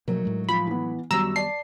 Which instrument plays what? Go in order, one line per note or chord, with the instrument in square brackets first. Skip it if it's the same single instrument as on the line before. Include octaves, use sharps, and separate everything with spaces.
[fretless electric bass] B2 F3 A#3 [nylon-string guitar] F#3 A3 D#4 [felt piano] A#4
[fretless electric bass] A2 G#3
[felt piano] F3 [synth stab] B5
[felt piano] E3 B3
[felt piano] F#2 [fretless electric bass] D#3 F#3 B3 [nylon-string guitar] G3 C#5 [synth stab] A#5 E6
[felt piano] D5 A5 [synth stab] C7